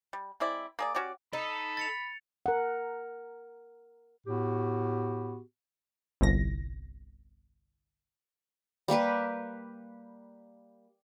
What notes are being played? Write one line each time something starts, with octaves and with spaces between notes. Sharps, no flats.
G3
G#3 C4 E4 D5
A#3 G#4 D5
C#4 F#4 G4 D5
D#4 A4 B5
A6 C#7 F7
A#4 F#5
A2 B3 F#4 G4
G1 C2 A#6
G3 A#3 G4 B4